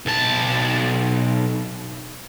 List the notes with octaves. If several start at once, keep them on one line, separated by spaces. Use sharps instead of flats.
B1 A5